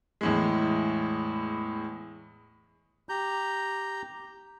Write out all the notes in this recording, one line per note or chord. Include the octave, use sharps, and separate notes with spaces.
E2 A2 G#3
G4 A#5 G6